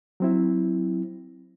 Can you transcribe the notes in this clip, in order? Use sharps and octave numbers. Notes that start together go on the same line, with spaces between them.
F#3 C4 E4